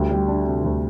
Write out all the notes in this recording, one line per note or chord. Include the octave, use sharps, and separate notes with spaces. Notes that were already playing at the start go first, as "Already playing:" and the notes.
Already playing: D2 G3
G3
D4
C3
D2